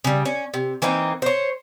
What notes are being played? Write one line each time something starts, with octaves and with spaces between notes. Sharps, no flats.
C#3 G3
C#4
C3
E3 A#3 C4 D#4
C5 C#5